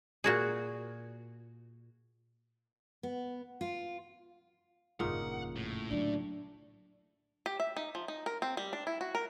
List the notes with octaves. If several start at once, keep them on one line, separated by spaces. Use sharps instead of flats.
A#2 F#4 G#4
B3
F4
G1 F2 A#2 C#3 D#4 F#5
A2
D3 F#3 D4
G4
E5
D#4
F3
D#4
A#4
C4
G3
D4
E4
F#4
A#4